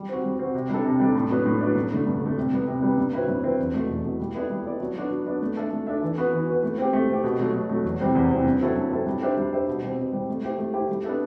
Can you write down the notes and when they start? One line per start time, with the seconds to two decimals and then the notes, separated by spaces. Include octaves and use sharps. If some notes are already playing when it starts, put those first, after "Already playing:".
Already playing: G3
0.09 C4 F#4
0.24 G3
0.39 C4 F#4
0.54 C3
0.69 G3 D4 A4
0.85 C3
1.00 G3 D4 A4
1.15 A2
1.30 F#3 B3 D4
1.46 A2
1.61 F#3 B3 D4
1.76 G2
1.91 D3 A3
2.07 G2
2.22 D3 A3
2.37 C3
2.52 G3 B3
2.67 C3
2.83 G3 B3
2.98 G2
3.13 F#3 C4 E4 B4
3.28 G2
3.43 F#3 C4 E4 B4
3.59 E2
3.74 B2 A3
3.89 E2
4.04 B2 A3
4.19 G3
4.35 B3 E4 A4 D5
4.50 G3
4.65 B3 E4 A4 D5
4.80 F#3
4.96 B3 D4 F#4
5.11 F#3
5.26 B3 D4 F#4
5.41 A3
5.56 D4 A4 E5
5.72 A3
5.87 D4 A4 E5
6.02 E3
6.17 B3 F#4 B4
6.33 E3
6.48 B3 F#4 B4
6.63 A3
6.78 C4 G4
6.93 A3
7.08 C4 G4
7.24 B2
7.39 F#3 A3
7.54 B2
7.69 F#3 A3
7.85 E2
8.00 C3 G3 C4
8.15 E2
8.31 C3 G3 C4
8.46 G2
8.61 F#3 C4 E4 A4
8.76 G2
8.92 F#3 C4 E4 A4
9.07 G3
9.22 D4 G4 C5 E5
9.37 G3
9.53 D4 G4 C5 E5
9.68 B2
9.82 G3 C4
9.98 B2
10.13 G3 C4
10.29 A3
10.43 E4 G4 C5
10.59 A3
10.74 E4 G4 C5
10.89 G3
11.04 B3 D4 A4 E5